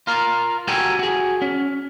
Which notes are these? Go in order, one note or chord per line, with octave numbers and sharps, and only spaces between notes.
F4 A#4 F5
F#4 G4 A4 A#4 G5 G#5
F#4 G#4
C#4